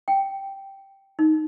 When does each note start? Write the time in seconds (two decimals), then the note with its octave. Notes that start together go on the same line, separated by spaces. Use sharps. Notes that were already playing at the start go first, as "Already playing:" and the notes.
0.08 G5
1.19 D#4